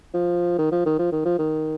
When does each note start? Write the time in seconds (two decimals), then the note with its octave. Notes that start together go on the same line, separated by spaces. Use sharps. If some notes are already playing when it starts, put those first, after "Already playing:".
0.14 F3
0.58 D#3
0.71 F3
0.86 D#3
0.98 F3
1.12 D#3
1.25 F3
1.38 D#3